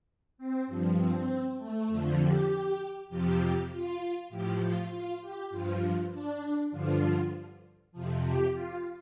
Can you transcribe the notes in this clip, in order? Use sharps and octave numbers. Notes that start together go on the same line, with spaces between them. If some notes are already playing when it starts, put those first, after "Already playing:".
C4
G2 F3
C4
A3
F2 D3 F3
G4
F2 C3 F3 G4
F4
A2 F3 G4
F4
F4
G4
G2 F3 F4
D4
G2 D3 F3 F4
F2 C3 F3
G4
F4